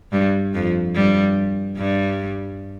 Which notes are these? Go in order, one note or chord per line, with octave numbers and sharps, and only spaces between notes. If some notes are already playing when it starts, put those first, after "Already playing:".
G2 G3
F2 F3
G2 G3
G2 G3